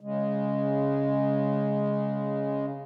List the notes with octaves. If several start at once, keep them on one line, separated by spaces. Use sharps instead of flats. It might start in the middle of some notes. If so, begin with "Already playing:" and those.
C#3 G#3